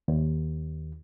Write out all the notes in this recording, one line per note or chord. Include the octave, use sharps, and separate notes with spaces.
D#2